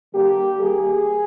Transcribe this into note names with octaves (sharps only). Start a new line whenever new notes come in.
D3 G3 A#3 G4
D#3 G3 A#3 G#4